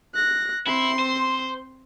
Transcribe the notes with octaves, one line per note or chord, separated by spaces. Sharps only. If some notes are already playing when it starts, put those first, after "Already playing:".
F#6 A#6
C4 E4 C6
C5